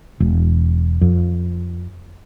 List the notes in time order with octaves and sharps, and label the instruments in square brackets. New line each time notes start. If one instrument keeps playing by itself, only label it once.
[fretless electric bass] E1
F2